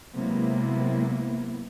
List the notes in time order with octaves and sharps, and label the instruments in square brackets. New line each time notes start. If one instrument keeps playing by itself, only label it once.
[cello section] C3 F#3 G#3 A#3 B3 E4